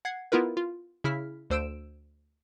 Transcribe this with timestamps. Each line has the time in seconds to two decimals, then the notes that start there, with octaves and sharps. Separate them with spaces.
0.05 F#5 G#6 C7
0.32 B3 E4 F4 A#4 B4
0.57 F4
1.04 C#3 E4 F6 B6
1.50 D2 C5 E6 D7 E7